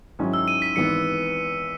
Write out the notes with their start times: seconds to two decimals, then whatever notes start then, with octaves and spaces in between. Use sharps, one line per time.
0.19 G#2 D#3 F#3 C#4 E4
0.34 E6
0.48 D#7
0.62 B6
0.76 G#1 G#2 E3 B3 C#7